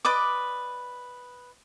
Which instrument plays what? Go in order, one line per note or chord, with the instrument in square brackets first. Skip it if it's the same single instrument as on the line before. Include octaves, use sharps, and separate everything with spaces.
[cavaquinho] B4 D5 D#5 D6